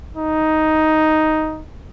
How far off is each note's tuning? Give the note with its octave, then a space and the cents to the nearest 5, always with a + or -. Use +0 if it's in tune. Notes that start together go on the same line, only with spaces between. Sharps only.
D#4 +5